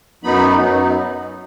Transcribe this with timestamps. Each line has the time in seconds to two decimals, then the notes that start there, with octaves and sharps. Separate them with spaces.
0.24 F#2 F#3 B3 D#4 B5
0.59 F#2 F#3 B3 D#4